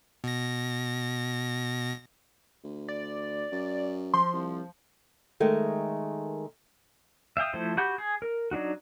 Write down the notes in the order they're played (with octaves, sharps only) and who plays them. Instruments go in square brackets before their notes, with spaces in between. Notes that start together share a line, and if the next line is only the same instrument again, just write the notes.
[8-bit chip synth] B2 A#6
[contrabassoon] D2
[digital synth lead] D5
[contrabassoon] F#2
[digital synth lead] F3 [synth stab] C6
[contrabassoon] C2
[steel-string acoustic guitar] D#3 G#3 A3 A#4
[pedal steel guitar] E5 F5 G5 D#6
F3 A3 E4 C5
F#4 G4 F#5 B5 G6
G#4
A#4
F#3 D4 D#4 F#4